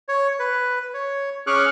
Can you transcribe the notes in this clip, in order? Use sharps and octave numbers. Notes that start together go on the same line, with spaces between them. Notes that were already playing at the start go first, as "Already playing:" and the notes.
C#5
B4
C#5
C#4 G#4 C#6 D6 F6 F#6